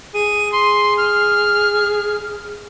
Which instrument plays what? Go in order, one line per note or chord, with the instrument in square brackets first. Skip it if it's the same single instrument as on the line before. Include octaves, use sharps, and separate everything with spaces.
[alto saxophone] G#4 [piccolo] D#7
[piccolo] C6
F6